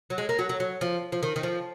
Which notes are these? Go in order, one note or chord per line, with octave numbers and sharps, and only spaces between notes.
F#3
G#3
A#3
F#3
F#3
F#3
F3
F3
D#3
D#3
F3